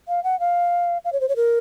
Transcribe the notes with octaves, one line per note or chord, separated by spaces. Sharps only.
F5
F#5
F5
F5
C#5
C5
C#5
A#4